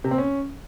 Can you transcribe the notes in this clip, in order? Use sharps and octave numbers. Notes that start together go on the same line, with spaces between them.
C3
C4
C#4